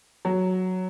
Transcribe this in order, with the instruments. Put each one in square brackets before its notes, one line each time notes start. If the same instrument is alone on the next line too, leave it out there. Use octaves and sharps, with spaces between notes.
[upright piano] F#3